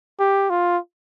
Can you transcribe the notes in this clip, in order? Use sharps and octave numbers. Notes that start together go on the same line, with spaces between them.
G4
F4